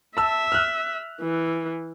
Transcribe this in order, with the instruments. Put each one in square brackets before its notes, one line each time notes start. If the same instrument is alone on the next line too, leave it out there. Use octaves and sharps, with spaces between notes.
[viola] E5 [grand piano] A5 E6
[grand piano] F6 F#6
[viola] E3